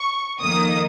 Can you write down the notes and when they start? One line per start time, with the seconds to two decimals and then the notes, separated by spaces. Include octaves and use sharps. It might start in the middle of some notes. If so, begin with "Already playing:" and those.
Already playing: C#6
0.40 F2 D#3 A#3 D#6